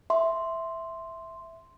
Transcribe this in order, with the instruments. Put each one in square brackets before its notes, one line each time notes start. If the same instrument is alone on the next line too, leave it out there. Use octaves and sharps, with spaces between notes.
[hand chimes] E5 C6